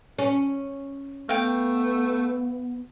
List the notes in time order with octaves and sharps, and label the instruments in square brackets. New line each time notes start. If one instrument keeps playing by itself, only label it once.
[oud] C#4
[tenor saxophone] A3 [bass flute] B3 [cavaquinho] F5 G5